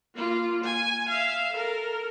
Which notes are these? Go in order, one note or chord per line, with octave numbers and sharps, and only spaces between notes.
A#3 F4
G#5
E5 F5
A4 A#4